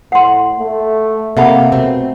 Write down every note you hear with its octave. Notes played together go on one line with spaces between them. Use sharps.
A2 F#5 C6
A3
C3 A#3 A4 E5 F#5 B5
B2 A3 C4